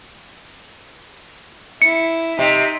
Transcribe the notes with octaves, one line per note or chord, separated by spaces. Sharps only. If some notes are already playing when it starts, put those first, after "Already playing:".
E4 C#7
C3 D#4